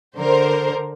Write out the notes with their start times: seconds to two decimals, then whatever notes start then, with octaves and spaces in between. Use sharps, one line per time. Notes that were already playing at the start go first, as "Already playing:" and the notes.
0.17 D3 A#4 C5